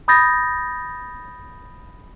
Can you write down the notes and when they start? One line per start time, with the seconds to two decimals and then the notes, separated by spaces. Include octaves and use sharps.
0.08 B5 D#6 G6 A6 A#6